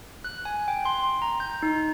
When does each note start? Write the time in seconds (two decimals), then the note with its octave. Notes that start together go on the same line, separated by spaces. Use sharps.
0.24 F#6
0.45 G#5
0.68 G5
0.85 C6
1.22 A#5
1.40 G6
1.63 D#4